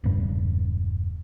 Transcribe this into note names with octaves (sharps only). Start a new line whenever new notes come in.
E1 G2